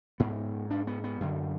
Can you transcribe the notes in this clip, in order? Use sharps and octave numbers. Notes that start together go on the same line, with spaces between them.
G#2 B3
D4
B3
B3
F#2 D3